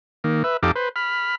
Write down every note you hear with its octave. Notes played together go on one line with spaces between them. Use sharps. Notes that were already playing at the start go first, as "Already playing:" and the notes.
D#3 A#3
B4 E5
F2 D#4 G4 A4 F5 D6
B4 C5
B5 F6